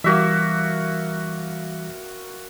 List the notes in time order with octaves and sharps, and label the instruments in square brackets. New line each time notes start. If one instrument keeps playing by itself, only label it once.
[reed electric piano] E3 G3 [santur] A#3 F#4 E5